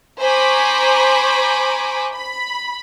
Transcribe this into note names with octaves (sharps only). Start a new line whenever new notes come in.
C5 G#5 A#5 B5 C#6 D6
B5